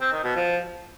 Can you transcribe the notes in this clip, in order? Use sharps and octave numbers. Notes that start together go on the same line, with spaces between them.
C4
D#3
B2
F3